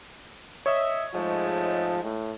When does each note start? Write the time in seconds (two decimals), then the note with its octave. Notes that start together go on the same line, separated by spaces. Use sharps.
0.66 C#5 D#5 E5
1.14 G#2 F3 G#3 A3
2.04 A2